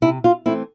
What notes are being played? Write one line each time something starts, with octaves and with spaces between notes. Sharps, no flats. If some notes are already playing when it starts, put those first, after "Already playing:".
C3 E4
F4
E3 A3 C4 E4